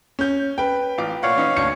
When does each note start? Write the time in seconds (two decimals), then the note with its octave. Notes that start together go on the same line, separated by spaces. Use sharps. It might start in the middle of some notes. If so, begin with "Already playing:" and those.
0.19 C#4 G6
0.58 B4 G5
0.98 A1 F4 D6
1.23 A#2 C#5 D5 F5 F#5
1.36 E3 C#4 D#4
1.57 D2 D4 C#7